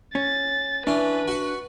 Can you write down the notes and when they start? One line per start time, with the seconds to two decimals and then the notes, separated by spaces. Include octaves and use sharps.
0.15 C#4 A6
0.87 E3 C#4 D4 B4
1.28 F#4 F#5